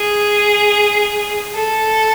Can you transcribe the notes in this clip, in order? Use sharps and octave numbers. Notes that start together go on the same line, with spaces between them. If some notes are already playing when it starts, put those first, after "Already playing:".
Already playing: G#4
A4